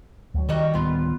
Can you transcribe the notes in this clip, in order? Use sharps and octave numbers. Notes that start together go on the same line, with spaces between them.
D2 F#3
D#3 G3 F#4 D#5
D1 D#3 G3 B3 F4